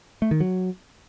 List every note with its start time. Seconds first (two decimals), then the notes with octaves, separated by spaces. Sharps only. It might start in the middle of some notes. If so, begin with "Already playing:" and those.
0.22 A3
0.31 D#3
0.40 F#3